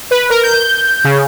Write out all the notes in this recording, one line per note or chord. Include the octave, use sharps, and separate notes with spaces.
B4
A#4
G6
C#3